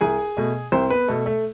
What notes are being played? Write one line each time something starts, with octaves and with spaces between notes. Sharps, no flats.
C2 G#4 G#5
B2 A3
C2 C4 C5
B3 B4
B2 A3 A4
A3 A4